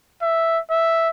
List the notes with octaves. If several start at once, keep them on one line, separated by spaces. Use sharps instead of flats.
E5
E5